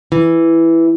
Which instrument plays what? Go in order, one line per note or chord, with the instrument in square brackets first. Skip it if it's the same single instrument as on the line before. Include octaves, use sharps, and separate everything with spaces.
[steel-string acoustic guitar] E3